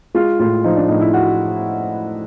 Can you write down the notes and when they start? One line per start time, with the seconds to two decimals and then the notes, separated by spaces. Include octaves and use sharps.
0.15 G#3 F4
0.39 A2 F4
0.64 F3 D#4
0.77 D4
0.88 A2 D#4
1.01 E4
1.14 F#4